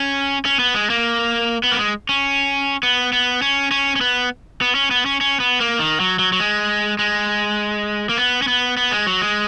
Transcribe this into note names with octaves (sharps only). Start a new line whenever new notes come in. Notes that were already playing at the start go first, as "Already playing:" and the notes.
Already playing: C#4
C#4
B3
G#3
A#3
B3
A#3
G#3
C#4
B3
B3
C#4
C#4
C#4
B3
B3
C#4
B3
C#4
C#4
B3
A#3
D#3
F#3
F#3
F#3
G#3
G#3
A#3
B3
C#4
B3
B3
G#3
F#3
G#3